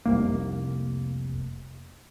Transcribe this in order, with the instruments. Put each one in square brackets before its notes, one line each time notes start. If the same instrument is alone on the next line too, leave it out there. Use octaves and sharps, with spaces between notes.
[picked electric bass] F1 C2 A#3